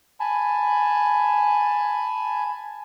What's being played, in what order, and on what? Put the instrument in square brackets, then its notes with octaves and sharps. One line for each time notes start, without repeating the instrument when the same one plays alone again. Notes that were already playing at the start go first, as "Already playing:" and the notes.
[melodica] G#5 A5 B5